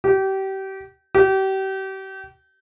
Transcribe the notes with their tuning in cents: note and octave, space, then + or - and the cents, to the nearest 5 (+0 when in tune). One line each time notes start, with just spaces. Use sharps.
G4 -30
G4 -35